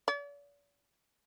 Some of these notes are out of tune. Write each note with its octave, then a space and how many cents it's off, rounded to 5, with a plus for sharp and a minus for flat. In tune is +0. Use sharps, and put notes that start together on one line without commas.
D5 -45